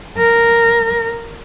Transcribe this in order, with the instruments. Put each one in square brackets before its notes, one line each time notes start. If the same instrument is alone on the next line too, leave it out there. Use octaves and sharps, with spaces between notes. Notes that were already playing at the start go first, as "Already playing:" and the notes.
[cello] A#4